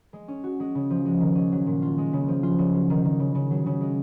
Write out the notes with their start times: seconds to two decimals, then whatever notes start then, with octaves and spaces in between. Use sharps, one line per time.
0.13 G#3
0.28 C#4
0.44 F#4
0.60 G#3
0.75 C#3
0.90 F3
1.05 G#3
1.20 D#3
1.35 C#4
1.52 F#3
1.66 A#2
1.82 F4
1.98 G#3
2.13 C#3
2.28 F3
2.43 F4
2.59 C#3
2.73 F#3
2.90 D#3
3.04 D#3
3.19 C#3
3.35 C#3
3.51 F#3
3.66 C#3
3.81 G#3